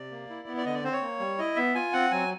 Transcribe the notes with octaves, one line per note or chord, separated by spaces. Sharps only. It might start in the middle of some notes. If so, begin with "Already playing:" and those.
Already playing: C3 D5
A#3
E4
B3
D5
D3 D#5
D5
C4 C5
C#5
A#3
G3
E4 D#5
B3 E5
F4 G#5
C4 F#5
F#3 G#5